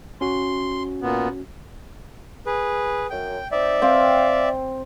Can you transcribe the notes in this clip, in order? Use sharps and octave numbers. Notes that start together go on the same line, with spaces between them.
C#4 F#4 C6
A#2 B3
G#4 B4
F#2 G5
C4 D#4 D5 E5
C4 F5 G5